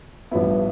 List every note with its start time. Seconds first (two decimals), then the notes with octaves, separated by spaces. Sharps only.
0.31 A1 G2 F3 B3 E4